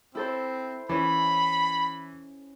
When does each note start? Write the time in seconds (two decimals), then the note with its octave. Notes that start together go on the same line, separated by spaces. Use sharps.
0.15 C4 E4 A4 C5
0.89 E3 C#4 B5